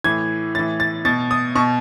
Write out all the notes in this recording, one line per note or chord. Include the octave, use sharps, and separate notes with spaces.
A2 E3 G#6
A2 E3 A6
A6
B2 A6
D#6
B2 C#6